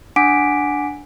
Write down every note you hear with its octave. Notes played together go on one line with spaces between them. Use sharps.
D4 F#5 G#5 D6 B6 D7